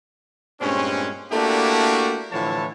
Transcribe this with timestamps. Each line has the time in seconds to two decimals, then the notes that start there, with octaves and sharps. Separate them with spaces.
0.61 G2 A#2 G#3 C4 C#4
1.32 A3 A#3 D4 E4 F#4 G4
2.32 A2 D3 E3 F3 C#5 A5